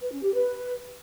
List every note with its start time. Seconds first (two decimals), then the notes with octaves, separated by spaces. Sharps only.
0.01 B4
0.12 C#4
0.23 G4
0.34 B4